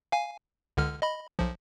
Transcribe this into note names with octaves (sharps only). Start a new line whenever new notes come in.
F5 G#5
C#2 D3 F6
D#5 B5
B1 F3